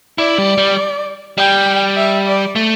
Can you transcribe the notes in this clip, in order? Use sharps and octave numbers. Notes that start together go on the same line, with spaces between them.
E4 D5
G3
G3
G3 G5
E5
D5
A3